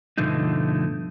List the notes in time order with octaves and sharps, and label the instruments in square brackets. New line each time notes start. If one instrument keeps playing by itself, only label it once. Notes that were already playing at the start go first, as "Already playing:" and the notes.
[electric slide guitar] G2 B2 D3 F3 A3 D#4